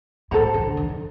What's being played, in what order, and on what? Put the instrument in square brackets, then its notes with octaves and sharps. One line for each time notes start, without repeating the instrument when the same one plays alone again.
[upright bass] A2 [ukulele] A4 C5 F#5 A#5
[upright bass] D3
D#3